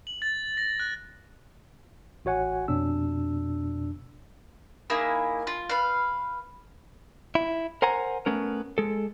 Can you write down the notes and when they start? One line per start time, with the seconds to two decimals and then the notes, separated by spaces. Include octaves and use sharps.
0.07 F#7
0.22 A6
0.57 A#6
0.79 F#6
2.25 A1 F#4 C#5 F#5 G#5
2.68 F2 B2 D4 E6
4.90 A#3 D#4 E4 G#4
5.47 F4
5.70 B4 F5
7.35 E4
7.82 A#4 C5 F#5 G#5 A#5
8.26 A3 B3 C#4 A#4
8.78 G#3 A4